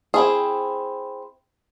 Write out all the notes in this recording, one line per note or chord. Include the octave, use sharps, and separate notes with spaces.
C4 E4 G#4